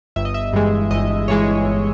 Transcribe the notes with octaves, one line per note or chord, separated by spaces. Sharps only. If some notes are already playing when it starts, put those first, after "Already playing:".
G1 E5
D#5
E5
G2 E3 G#3
G1 D#5
G2 E3 G#3 C#5
G1